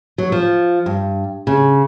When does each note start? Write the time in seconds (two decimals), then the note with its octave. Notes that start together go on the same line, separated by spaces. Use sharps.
0.18 F#3
0.32 F3
0.86 G2
1.47 C#3